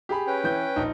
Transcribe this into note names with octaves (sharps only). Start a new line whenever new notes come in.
G4 G#4 B5
C#4 B4 G5
E3 G6
A#1 D#4